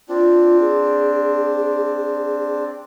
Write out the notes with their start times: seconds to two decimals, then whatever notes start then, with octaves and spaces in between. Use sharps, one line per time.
0.09 C4 D4 F4
0.61 G#4